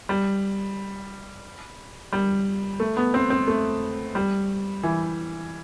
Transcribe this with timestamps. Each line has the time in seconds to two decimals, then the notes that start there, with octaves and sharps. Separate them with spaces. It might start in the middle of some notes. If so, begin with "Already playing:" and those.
0.09 G3
2.13 G3
2.80 A3
2.97 B3
3.14 C4
3.30 C4
3.48 A3
4.15 G3
4.83 E3